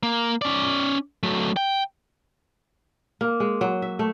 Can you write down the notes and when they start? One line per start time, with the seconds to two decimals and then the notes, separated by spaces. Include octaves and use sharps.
0.03 A#3
0.42 C#4 D5
1.23 F#3 A3
1.57 G5
3.21 A#3
3.40 G#3
3.61 F#3
3.82 E5
3.99 A3